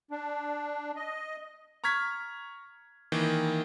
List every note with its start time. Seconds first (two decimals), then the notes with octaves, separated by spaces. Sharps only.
0.11 D4
0.96 D#5
1.84 A#5 C#6 F6 G#6 B6
3.12 D#3 E3 A#3